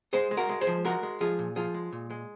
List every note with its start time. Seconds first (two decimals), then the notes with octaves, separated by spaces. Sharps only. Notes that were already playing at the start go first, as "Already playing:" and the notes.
0.13 G#3 G#4 C5
0.31 G#3
0.37 F#4 A#4
0.49 G#3
0.61 G#4 C5
0.67 F3
0.85 G#3 F#4 A#4
1.03 G#3
1.21 F3 F4 G#4
1.39 A#2
1.56 F3 F4 G#4
1.74 G#3
1.92 A#2
2.10 G#3